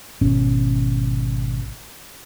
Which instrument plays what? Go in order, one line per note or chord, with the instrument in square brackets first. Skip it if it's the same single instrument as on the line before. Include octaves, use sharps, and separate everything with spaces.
[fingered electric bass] G#1 B2 C#4